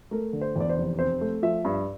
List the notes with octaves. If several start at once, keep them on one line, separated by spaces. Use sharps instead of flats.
A3 A#4
D3
C5
E2 D5
C5
F1
C4 C5
A3
F3 E5
G2